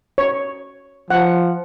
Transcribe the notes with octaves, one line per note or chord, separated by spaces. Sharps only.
C#5
F3 F#5